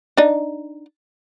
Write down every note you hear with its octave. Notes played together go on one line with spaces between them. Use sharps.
D4 D#4